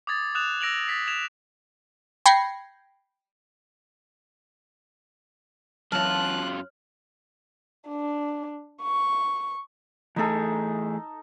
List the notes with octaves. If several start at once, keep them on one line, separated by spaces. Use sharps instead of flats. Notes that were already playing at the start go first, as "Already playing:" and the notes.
D6 D#6 G#6 A6
D#6 F#6 E7 F7
E6 A#6 D7 F7 F#7
A6 B6 C7
G#6 E7 F7
G5 B5 G#6 A#6 C7 C#7
F#2 E3 F4 C#5 A5 F6 F#6
D4
C#6
E3 A3 D#4 G#4 A4